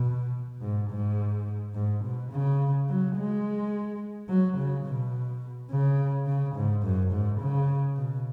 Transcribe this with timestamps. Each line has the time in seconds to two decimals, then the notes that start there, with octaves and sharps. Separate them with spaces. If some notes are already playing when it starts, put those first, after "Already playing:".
Already playing: B2
0.61 G#2
0.90 G#2
1.74 G#2
2.03 B2
2.32 C#3
2.88 F#3
3.16 G#3
4.29 F#3
4.57 C#3
4.86 B2
5.70 C#3
6.27 C#3
6.55 G#2
6.83 F#2
7.11 G#2
7.40 C#3
7.97 B2